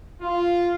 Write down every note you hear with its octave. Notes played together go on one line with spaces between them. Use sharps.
F4